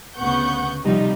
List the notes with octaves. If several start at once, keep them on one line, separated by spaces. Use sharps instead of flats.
D2 C#3 B3 F#5 C#6 G6
C3 F3 G3 D#4